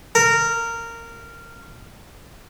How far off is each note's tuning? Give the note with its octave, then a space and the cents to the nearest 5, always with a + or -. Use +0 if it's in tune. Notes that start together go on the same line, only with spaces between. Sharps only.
A#4 -15